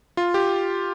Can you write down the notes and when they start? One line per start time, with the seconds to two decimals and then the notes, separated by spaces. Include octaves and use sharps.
0.17 F4
0.34 G4